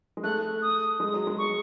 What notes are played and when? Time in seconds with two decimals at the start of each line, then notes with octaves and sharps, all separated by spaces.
0.17 G#3
0.23 A3 F#6
0.62 D#6
1.00 G#3
1.14 F#3
1.27 G#3
1.38 C#6